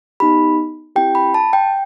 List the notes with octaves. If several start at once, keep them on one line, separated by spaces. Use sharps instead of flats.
B3 D#4 G4 B5
C4 E4 G4 G5
B5
A5
G5